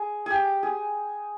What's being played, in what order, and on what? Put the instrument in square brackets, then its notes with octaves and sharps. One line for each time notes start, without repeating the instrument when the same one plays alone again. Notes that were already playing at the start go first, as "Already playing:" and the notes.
Already playing: [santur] G#4
G4 G#4
G#4